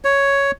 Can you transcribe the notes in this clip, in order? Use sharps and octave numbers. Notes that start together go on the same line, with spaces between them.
C#5